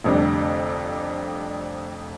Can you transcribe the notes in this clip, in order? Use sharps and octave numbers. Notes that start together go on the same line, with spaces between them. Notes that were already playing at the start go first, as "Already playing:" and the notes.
F1 F2 D3 G3 D4